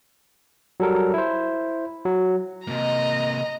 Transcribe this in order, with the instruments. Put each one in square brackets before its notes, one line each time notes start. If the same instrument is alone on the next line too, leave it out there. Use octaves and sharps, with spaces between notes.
[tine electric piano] F#3 G3 A4 A#4
E4 C5
F#3
[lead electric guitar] C3 A#3 [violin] D#5 A#5